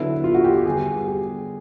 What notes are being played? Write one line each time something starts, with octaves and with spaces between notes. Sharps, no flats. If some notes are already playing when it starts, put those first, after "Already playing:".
Already playing: D3 F#3 B3 D4 E4
F4
F#4
G4
G4
D3 G3 B3 G#4
G4